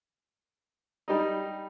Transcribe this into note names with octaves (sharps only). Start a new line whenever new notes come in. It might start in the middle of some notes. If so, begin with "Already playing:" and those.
G3 D#4